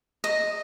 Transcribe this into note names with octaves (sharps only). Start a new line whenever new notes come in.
D#5